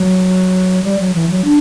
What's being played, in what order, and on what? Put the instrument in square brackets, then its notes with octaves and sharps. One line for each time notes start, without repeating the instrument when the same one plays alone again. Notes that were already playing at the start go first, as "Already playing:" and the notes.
Already playing: [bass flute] F#3
G3
F#3
E3
F#3
D4